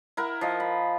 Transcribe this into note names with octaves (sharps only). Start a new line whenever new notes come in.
E4 A#4 F#5
F3 D#5
B5